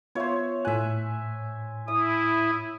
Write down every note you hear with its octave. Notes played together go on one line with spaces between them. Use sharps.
B3 F4 C5 C#5 E5
A2 E5 G#5 F#6
E4 E5 D#6